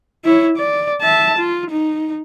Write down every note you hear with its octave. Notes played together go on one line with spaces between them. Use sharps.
E4 C#5
D5
E5 A5
F4
D#4